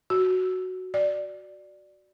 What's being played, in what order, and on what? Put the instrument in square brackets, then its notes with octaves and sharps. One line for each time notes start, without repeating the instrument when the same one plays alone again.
[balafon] F#4
D5